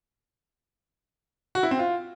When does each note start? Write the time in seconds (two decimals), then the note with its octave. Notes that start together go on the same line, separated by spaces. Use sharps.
1.55 F#4
1.63 E4
1.71 C4
1.79 F4